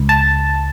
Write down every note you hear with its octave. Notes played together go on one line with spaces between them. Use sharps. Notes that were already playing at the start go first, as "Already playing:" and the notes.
Already playing: C#2
A5